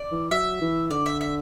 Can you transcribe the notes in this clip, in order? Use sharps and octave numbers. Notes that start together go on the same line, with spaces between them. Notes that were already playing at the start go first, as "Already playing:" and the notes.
Already playing: D5
E3
F#3 E5
E3
D3 D5
E5
E5